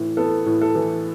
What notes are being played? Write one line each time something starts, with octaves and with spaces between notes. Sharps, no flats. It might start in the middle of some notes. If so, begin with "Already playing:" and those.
Already playing: A2 E3
B3 A4
A2
A4
E3